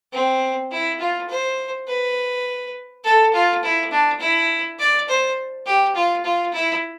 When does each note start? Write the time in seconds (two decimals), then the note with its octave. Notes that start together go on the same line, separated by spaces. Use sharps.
0.13 C4
0.71 E4
1.00 F4
1.29 C5
1.87 B4
3.04 A4
3.33 F4
3.63 E4
3.91 D4
4.20 E4
4.79 D5
5.08 C5
5.66 G4
5.95 F4
6.24 F4
6.53 E4